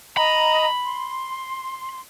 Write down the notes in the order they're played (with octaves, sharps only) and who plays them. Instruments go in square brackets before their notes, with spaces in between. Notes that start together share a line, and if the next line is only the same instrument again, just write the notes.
[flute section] D#5 A#5 [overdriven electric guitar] B5
[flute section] C6